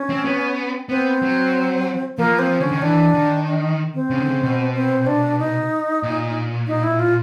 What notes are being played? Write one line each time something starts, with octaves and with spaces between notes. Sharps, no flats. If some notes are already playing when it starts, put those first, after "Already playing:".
Already playing: C#4
C4
B3
B3 C4
F#3
F3 A#3
C4
D3 C#4
D#3
E3 D4
D#3
D4
D#4
C4
C#3
D3
C#3
B2
C4
D4
D#4
A#2
D#4
E4
F4